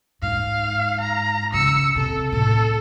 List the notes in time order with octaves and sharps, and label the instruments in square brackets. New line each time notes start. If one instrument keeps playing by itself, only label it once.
[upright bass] G#2 [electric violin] F5
[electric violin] A#5
[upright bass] C#3 [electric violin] E6 C#7
[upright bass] C3 [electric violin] A4
[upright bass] A2 [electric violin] A4